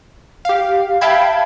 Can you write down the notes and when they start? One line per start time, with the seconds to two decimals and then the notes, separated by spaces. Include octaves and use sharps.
0.45 G4 F5
1.01 E5 F5 G5 A5 B5 G#6